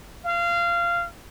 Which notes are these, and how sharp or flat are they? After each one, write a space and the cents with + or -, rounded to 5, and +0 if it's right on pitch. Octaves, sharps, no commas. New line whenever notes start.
F5 -20